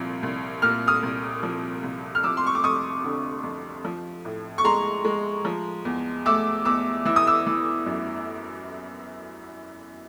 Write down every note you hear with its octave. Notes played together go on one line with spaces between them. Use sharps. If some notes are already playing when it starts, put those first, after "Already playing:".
Already playing: C2 A#2 F3
C2
A#2 F6
D#6 F6
C2
F3
C2
F6
F3 D6 E6
C6
C#6
D6
F2 C#6 D#6
D3
F2
F3
A2
C#6
G#3 A#5 C6
G#3
F3
E2
A3 D6 E6
E2 D6 E6
E3 E6
D#6
D6 E6
E3
F#2